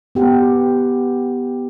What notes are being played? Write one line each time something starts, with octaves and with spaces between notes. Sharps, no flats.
B3 G4 F#5